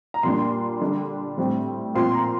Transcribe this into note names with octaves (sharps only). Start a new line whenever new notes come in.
A#5
A#2 G3 A#3 D4 C6
D3 G3 D4
A2 G3 C4
A#2 F3 C4 C6
A#5